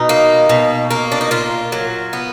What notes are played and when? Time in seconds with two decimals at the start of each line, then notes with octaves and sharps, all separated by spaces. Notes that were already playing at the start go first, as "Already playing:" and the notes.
Already playing: B2 D#4
0.09 A#3
0.49 B2
0.91 A#3
1.12 D4
1.21 D#4
1.31 A#2 F4
1.72 F#3
2.13 B3